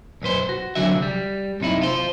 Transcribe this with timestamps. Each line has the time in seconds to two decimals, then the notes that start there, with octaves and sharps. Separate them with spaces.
0.22 B1 F#2 B4 C5
0.49 F#4
0.75 C2 F#2 D3 F#3 F#4 E5
1.02 G3
1.60 F#2 C3 D#4 E4
1.82 F4 C5